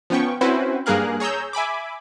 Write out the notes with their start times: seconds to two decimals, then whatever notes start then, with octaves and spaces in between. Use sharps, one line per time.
0.10 F3 B3 C#4 G5 C#6
0.41 C4 C#4 E4 F#4 B4 C5
0.86 G2 A#3 G#4 A#4 F5 F#6
1.20 G#4 C#5 A#5 E6 G6
1.53 E5 G#5 B5 D6